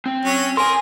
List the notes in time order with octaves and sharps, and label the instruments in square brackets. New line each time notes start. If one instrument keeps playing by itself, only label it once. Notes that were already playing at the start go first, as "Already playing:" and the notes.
[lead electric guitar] C4
[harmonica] F#3 C#4
[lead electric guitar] A4 G#5 [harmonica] A#4 [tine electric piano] C6